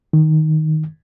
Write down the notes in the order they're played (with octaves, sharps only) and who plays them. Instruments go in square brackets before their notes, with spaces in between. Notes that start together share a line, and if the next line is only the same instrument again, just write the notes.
[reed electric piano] D#3